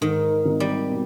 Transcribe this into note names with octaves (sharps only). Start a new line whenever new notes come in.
G#2 D#3
G#1
G3
B2